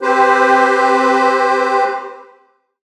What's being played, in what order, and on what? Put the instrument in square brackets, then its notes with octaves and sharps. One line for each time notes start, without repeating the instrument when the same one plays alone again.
[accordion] C4 G4 B4 C5